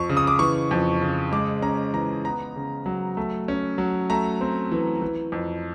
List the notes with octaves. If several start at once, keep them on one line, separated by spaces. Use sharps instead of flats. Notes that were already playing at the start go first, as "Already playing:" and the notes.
Already playing: F2 F3 C#6
C#3
D#6
D6
E3 C#6
F2
C#3
G#3 D6
C#4 A#5
E3 A#5
B3 A#5
C#3
F#3
A3
C#4
F#3
A3 A#5
C4
E3
E3
F2